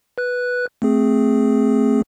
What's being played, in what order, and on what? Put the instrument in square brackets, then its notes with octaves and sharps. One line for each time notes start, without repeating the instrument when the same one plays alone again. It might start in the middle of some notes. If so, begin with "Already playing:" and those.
[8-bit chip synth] B4 F#6
A3 C4 G#4